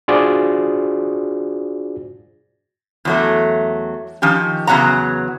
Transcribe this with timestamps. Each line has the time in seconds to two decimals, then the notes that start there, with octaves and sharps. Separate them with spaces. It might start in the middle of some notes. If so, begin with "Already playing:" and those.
0.08 D4 F4 F#4 G#4 C5 D5
3.05 E2 F#3 A3
4.22 D#3 F3 C#4 G4
4.67 E2 C#3 F#3 B3 F#5 A#5